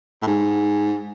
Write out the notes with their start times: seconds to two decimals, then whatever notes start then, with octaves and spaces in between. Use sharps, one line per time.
0.22 A2
0.27 G#2